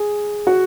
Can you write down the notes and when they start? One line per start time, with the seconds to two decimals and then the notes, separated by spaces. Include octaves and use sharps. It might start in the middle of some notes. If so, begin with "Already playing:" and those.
Already playing: G#4
0.47 F#4